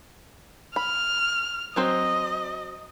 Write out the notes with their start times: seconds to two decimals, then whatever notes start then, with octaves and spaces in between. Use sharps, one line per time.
0.76 B5 F6
1.76 F#3 C4 C5 D#5